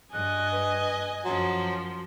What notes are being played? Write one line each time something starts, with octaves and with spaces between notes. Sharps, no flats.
G2 D#5 G#5 F#6
B4
F#2 F3 F#3 C6